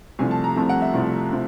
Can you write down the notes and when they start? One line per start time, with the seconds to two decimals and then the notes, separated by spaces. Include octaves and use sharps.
0.19 C2 C3 F3 A3 G#5
0.31 A5
0.44 A#5
0.56 C2 C3 F3 A3 A5
0.69 F#5
0.82 E5
0.93 C2 C3 F3 A3
1.32 C3 F3